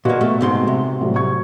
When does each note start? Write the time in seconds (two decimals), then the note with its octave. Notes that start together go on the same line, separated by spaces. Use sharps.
0.05 A#2 A#3 F#4 B4 D#5
0.21 B2 A3
0.41 G#2 C3 C6
0.67 C3
1.01 A2 F#3 G3
1.16 C#6 G#6